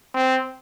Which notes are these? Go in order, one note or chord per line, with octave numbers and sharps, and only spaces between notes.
C4